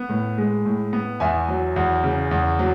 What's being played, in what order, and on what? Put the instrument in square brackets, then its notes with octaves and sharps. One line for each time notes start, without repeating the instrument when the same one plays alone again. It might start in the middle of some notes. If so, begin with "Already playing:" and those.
Already playing: [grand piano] B3
A2
G#3
A2
B3
E2 E5 G#5
F#3
E2
C#3
E2
F#3